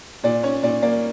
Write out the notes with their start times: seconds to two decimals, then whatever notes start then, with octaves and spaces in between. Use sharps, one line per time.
0.24 A#2 D5
0.43 C#4 C#5
0.63 A#2 D5
0.82 A#3 D5